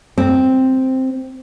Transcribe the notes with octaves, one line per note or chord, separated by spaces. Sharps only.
C4